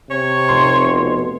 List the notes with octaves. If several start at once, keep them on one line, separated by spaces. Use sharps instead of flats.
C3 C#5
F1 C6
B2